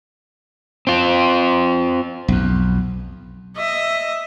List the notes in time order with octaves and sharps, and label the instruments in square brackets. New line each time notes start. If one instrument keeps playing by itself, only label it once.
[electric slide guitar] C4 F4
[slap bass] B1 F2
[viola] D#5 E5